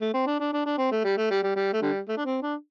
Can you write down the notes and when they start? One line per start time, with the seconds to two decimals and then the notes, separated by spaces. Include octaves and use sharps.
0.01 A3
0.14 C4
0.26 D4
0.40 D4
0.53 D4
0.65 D4
0.78 C4
0.91 A3
1.04 G3
1.17 A3
1.30 G3
1.43 G3
1.56 G3
1.73 A3
1.82 D3 G3
2.08 A3
2.17 D4
2.25 C4
2.42 D4